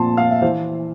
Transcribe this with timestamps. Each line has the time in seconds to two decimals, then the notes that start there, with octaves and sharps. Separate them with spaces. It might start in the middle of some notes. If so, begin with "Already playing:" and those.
Already playing: A#2 F3 C4 A5 C6
0.17 F5
0.31 E5
0.42 E3 C5